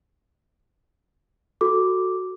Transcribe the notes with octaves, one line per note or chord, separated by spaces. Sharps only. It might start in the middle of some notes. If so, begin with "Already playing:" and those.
F#4 A4 D6